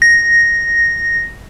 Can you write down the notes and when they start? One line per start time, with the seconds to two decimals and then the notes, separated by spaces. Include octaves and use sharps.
0.02 A#6